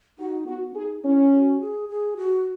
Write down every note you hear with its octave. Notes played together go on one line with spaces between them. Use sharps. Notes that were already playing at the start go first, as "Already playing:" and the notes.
D#4 F#4
B3 F#4
D#4 G#4
C#4 E4
F#4
G#4
G#4
F#4